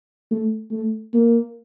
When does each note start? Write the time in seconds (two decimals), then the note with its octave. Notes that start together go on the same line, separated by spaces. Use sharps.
0.31 A3
0.71 A3
1.13 A#3